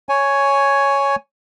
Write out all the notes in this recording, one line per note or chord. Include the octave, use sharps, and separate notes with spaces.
C#5 G#5